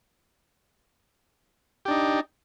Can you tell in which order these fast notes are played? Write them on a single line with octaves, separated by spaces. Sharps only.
G4 D4 D#4